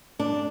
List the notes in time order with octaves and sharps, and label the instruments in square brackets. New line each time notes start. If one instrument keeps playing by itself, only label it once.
[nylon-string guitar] D4